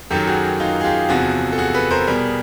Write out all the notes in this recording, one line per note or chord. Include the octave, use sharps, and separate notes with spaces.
F#2 D#3 F#3 G4 A4
F#4 G#4
D#4 F4
G#4
F4 G4
E2 C3 F3 F#4 G#4
A4
F#4 G#4
A4 B4
A#4 C5
B2 G3 G#4 A#4